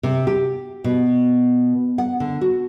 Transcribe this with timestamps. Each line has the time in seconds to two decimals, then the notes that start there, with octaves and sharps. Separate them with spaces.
0.03 C3
0.27 G4
0.84 B2
1.98 F#5
2.20 D3
2.41 F#4